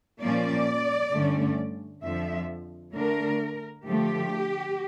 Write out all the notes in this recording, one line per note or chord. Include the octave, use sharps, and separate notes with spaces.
A#2 F3 A#3 C#4 D5
G2 D3 A3 C#4
F2 D3 F3 E5
D3 A3 D4 A#4
D3 F3 A3 G4